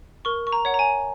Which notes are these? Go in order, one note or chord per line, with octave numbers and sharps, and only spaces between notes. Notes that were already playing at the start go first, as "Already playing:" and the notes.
A#4 C#6
C#6
A#5
C#5 F#5
A#5
G#5